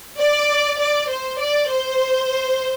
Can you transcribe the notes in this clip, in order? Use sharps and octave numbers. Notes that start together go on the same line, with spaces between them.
D5
D5
C5
D5
C5